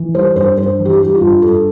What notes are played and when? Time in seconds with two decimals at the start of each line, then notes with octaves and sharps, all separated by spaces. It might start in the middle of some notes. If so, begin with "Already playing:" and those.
Already playing: E3
0.15 G3 C5
0.36 G2 C5
0.57 G2 C5
0.79 E3
0.85 G4
1.00 G3 G4
1.15 F4
1.21 G2
1.42 G2 A4